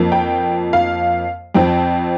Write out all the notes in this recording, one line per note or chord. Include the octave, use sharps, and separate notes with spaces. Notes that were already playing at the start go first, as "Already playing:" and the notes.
Already playing: F2 F3 A#3
G5
F5
F2 F3 C4 G5